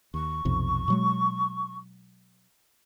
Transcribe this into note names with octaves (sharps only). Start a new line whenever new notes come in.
D#2 C#6
B1 F2 C3
B2 F#3 G#3